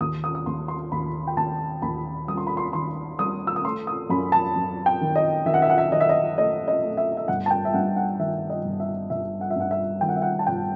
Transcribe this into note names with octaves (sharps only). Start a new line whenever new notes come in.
D#2 D#6
D#6
D#6
D#2 C6
C6
D#2 B5
G5
D#2 A5
D#2 B5
G3 D#6
C6
B5
C6
D#3 C6
G3 D#6
E6
D#6
A3 C6
D#6
F#2 B5
A5
F#2
G5
D#3
D#5
D#3 E5
F#5
E5
F#5
E5
D#3 D#5
E5
D#5
A3 D#5
D#5
A3
E5
E5
G1 F#5
A5
G5
E5
G2 F#5
F#5
D#3 E5
D#5
G1
E5
G1 E5
F#5
E5
G2 F#5
E5
D#3 G5
F#5
E5
F#5
A5
G1 G5